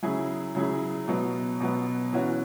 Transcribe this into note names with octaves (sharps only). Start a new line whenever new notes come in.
C#3 F#3 E4 G#4
C#3 F#3 E4 G#4
B2 F#3 B3
B2 F#3 B3
E3 C#4 F#4